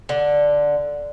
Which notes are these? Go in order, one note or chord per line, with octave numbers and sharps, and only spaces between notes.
D3